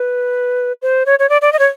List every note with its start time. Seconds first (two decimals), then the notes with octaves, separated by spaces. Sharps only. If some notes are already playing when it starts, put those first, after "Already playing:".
Already playing: B4
0.82 C5
1.06 C#5
1.19 C#5
1.30 D5
1.42 D5
1.53 D#5
1.59 C#5